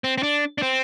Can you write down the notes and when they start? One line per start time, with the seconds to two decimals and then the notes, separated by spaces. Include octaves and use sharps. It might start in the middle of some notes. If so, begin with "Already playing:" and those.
0.04 C4
0.18 C4
0.23 D4
0.58 D4
0.62 C4